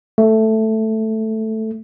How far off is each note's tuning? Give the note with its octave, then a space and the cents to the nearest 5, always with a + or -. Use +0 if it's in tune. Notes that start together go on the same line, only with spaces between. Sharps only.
A3 +0